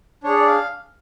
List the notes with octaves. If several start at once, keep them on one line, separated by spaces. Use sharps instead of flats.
D4 G#4 C#5
D5
F5